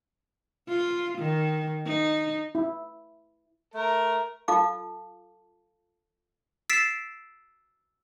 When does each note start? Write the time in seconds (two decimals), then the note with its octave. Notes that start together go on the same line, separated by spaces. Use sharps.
0.68 F4
1.18 D#3
1.86 D#4
2.55 E4
3.74 A3 A#4
4.48 F4 A4 F5 A5 D6
6.69 E6 A6 B6 C7 D7 E7